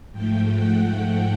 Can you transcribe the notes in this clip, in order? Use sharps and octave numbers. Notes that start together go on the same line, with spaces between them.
G#2 F3 A3 G5
F#5